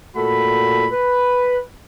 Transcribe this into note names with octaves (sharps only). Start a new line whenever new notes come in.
A#2 A3 F#4 B5
B4